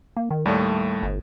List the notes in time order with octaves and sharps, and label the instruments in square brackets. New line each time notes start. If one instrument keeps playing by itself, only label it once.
[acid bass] A#3
D#3
[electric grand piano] D#2 A2 A3 [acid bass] G3
[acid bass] G1